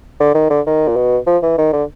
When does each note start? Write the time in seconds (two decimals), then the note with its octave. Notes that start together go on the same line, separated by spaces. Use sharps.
0.20 D3
0.34 D#3
0.50 D3
0.66 D#3
0.88 A#2
0.96 B2
1.27 F3
1.43 E3
1.58 D#3
1.73 D3